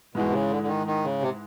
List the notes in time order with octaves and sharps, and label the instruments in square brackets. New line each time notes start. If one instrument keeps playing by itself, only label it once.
[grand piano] G#2 E3 G#3 [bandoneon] B2
[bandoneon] C3
C#3
D3
D3
D#3
D#3
C#3
C3